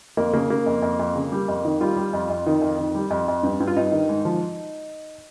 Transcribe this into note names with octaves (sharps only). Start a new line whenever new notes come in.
F2 A#3
C#3 A#3
C#3 A#3
F2
F2
F2
C#3
G3
F2
D#3
G3 F4
G3
F2
F2
D#3
F2
D#3
G3
F2
F2
G2
G2
F4
G2 D#4
D#3
G#2
F3